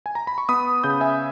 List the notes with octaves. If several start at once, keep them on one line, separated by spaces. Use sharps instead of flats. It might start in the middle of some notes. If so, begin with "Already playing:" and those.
G#5
A#5
B5
C#6
B3 B5 D#6
C#3 D#6 G6
E5 G#5